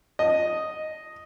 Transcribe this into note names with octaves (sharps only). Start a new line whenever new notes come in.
D#5